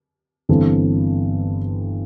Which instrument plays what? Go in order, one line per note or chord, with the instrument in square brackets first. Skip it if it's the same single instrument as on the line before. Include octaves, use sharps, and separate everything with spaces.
[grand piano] G1 G2 E3 C4 A4